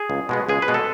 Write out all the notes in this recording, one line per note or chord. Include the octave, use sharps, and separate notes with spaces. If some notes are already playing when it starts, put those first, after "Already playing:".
Already playing: G#4
C#2
B2 G#3 B3
C#2 G#4
B4
B2 G#3 B3
A4